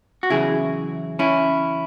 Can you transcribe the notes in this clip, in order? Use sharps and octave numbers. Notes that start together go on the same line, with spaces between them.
F#4
E2 C#3 F#3 E4 G#4
C#4 E4